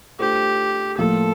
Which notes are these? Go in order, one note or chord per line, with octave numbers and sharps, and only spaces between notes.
A3 D4 F4 G4 C5
A2 F3 A#3 F4 A4